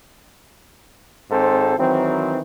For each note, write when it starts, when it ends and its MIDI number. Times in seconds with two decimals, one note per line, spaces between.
1.31 1.76 32
1.31 1.76 44
1.31 1.76 60
1.31 1.76 69
1.31 1.76 72
1.77 2.40 51
1.77 2.40 52
1.77 2.40 54
1.77 2.40 60